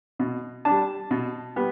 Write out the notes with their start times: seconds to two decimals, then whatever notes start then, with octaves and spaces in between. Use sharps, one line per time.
0.19 B2
0.65 G3 D4 A5
1.11 B2
1.56 G3 B3